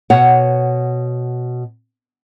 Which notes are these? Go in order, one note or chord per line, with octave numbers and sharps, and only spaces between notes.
B2 C#5 F#5